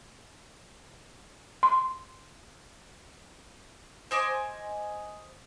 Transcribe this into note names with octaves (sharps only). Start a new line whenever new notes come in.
C6
C5 D#5 G#5 D6